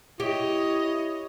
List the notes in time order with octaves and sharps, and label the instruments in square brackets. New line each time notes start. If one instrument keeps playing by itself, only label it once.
[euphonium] E4 [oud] G4 [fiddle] C#5 D#5